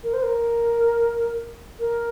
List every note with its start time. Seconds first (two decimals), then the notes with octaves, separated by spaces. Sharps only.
0.04 A#4
0.14 C5
0.23 A#4
1.80 A#4